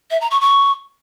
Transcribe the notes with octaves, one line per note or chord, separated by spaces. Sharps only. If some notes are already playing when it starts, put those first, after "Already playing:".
E5
A#5
C#6
C#6